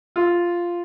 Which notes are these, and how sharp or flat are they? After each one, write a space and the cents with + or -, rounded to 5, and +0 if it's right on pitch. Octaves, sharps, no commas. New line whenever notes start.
F4 -5